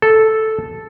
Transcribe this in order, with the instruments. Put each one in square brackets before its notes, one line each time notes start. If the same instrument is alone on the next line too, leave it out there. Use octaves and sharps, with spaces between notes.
[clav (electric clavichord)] A4